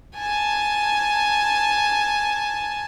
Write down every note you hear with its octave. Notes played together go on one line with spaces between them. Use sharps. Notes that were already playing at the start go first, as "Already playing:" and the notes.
G#5 A5